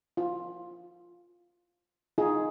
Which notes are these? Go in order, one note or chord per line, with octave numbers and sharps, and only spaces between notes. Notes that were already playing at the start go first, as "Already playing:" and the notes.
F4
D#4 F4 G#4